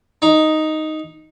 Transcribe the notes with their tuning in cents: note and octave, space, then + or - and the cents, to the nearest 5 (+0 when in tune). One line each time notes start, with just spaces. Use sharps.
D#4 +0